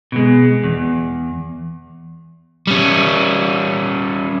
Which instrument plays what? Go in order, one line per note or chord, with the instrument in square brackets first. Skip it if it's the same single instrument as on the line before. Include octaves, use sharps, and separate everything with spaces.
[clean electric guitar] B2 G#3
E2
[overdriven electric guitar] G3 C#4